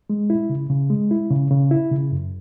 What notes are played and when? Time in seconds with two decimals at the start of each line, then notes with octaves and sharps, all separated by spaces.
0.10 G#3
0.30 E4
0.50 C#3
0.70 C#3
0.90 G#3
1.11 E4
1.31 C#3
1.51 C#3
1.71 E4
1.92 C#3
2.12 F#2